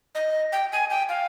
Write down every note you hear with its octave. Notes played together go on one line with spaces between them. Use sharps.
D#5
G5
G#5
G5
F5